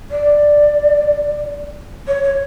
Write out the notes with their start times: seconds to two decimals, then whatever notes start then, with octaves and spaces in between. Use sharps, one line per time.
0.10 D5
2.07 C#5
2.23 C#5